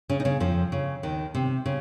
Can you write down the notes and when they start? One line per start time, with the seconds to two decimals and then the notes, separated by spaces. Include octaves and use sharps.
0.09 C#3 C#4
0.20 D#4
0.25 C#3 C#4
0.40 F2 F3
0.72 C#3
1.03 D#2 D#3
1.35 C3
1.66 C#3